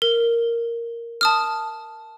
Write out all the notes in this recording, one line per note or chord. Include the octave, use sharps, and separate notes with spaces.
A#4
A5 D#6 F6